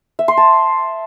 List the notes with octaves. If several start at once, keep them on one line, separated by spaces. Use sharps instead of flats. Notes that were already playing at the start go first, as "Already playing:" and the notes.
E5
C6
A5